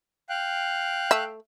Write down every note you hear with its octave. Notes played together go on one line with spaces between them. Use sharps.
F5 G5 F#6
A3 E5